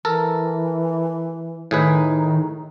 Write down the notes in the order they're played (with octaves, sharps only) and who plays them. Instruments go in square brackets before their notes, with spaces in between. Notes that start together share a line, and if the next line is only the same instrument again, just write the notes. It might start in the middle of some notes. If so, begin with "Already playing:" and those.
[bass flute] E3 [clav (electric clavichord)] A4 A#4
[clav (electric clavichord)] A2 G#4 B4 [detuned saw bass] D#3 [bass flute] D#4